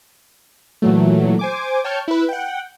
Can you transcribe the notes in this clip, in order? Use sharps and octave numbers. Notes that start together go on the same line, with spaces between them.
A#2 E3 F#3 A3
C5 G#5 D6
C#5 G5 A5 C#6 F6 G6
E4 B4
F#5 G5